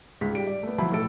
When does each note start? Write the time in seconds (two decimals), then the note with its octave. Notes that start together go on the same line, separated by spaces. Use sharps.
0.21 C#2 G#2 B6
0.35 G3 D7
0.47 D5
0.63 A3 B3
0.78 F3 F#3 E4 B5
0.92 B1 A2 A4 D7